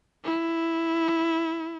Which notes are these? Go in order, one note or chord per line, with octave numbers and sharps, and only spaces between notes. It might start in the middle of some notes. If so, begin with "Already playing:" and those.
E4